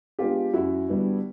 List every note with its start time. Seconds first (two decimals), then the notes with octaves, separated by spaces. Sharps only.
0.19 G#3 B3 D4 F4 G4
0.53 F#2 E4 F#4
0.89 D3 G3 B3 D4